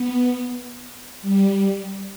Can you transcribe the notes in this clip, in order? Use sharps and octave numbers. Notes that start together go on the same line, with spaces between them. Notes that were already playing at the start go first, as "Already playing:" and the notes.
Already playing: B3
G3